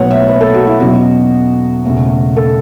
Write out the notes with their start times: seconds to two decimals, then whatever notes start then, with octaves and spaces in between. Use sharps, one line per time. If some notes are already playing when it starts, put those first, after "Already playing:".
Already playing: B1 A2 F#3 B3 C#5 F#5
0.11 E5
0.28 B4
0.41 A4
0.54 F#4
0.67 E4
0.80 E2 B2 F#3 C#4 F#4
1.85 E1 E2 C#3 A3 C#4
2.36 A4